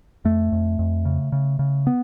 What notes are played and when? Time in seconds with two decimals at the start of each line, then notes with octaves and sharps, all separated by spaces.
0.25 F2 A3
0.52 F2
0.79 F2
1.05 C#3
1.32 C#3
1.59 C#3
1.87 B3